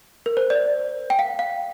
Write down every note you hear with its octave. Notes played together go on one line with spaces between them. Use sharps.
A#4
C5
D5
G5
F5
F5